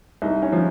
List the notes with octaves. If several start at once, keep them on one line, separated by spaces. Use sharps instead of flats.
C2 D#4
C#4
F3